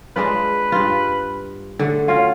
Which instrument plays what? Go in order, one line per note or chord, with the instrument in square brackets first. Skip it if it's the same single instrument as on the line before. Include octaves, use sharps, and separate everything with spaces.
[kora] G#3 D4 F4 [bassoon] B4
[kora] G2 F4
D3 A3
[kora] C#4 F#4 [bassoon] F4